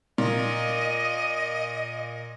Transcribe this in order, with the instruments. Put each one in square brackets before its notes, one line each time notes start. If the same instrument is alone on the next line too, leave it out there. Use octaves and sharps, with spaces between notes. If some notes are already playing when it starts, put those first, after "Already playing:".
[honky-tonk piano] A#2 [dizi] D#5